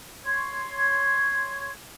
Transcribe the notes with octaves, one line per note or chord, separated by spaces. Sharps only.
C#5 C6 C#6 G#6